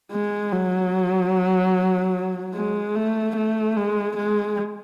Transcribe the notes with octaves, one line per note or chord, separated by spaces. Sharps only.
G#3
F#3
G#3
A3
A3
G#3
G#3